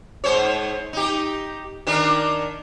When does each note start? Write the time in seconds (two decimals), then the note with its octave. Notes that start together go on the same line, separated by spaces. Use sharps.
0.24 G#2 C5 C#5
0.93 D#4 G4
1.87 D#3 D4 A#4